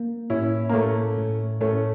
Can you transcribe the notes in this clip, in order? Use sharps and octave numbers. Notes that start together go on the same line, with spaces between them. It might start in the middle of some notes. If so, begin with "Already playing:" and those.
Already playing: A#3
A2 C#4 E4
A#3
A2 A3 C#4
A2
A2 A3 C#4